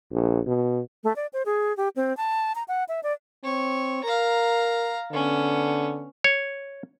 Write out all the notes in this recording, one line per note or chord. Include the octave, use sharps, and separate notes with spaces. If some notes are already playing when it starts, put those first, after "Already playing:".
A#1
B2
A3
D5
C5
G#4
G4
C4
A5
A#5
F#5
E5
D5
C4 C#5
A#4 F5 A#5
D3 B3 C#4
C#5